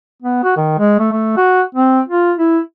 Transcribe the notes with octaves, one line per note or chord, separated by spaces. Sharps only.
B3
F#4
D#3
G#3
A3
A3
F#4
C4
F4
E4